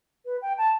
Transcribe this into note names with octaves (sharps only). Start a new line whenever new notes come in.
B4
G5
A5